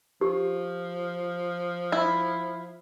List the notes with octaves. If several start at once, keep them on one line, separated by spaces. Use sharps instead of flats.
F3 G4
E4